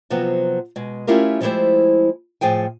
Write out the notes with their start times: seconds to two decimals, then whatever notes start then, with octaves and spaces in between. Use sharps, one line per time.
0.10 C3 F3 F#3 B3 C4
0.76 B2 G#3
1.07 A3 C#4 E4 F4 G4 A#4
1.41 F3 G#3 A3 E4 G4 C5
2.41 A2 F3 G#4 G5 G#5